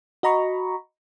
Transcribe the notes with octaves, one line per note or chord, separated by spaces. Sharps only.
F#4 D#5 A#5 B5 C#6